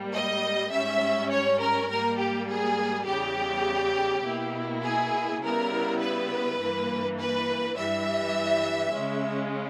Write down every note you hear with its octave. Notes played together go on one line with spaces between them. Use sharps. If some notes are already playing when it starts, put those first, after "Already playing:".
Already playing: G#2 G3 A#3
D#5
G#2 G3 C#4 E5
C#5
A#4
G#2 G3 A#3 A#4
G4
G#4
E2 C#3 G3 G4
B2 A#3 E4
G#4
C#3 G3 B3 E4 A#4
B4
G2 E3 A#3
B4
G2 E3 G3 E5
C#3 G#3 C#4